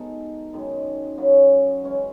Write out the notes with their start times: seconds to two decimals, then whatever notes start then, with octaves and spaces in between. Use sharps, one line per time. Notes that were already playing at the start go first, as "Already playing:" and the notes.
Already playing: B2 G#3 D#4 A4
0.53 F#2 D#3 G#3
1.18 F#2 C#3 F#3 C#4
1.83 E3 G#3 C#4